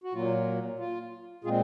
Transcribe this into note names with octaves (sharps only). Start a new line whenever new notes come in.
F#4
A#2 F#3 A#3 F4
F4
A#2 G#3 C4 F4 G#4